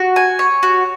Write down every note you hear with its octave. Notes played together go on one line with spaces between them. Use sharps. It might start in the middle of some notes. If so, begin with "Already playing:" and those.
Already playing: F#4
G#5
C#5
F#4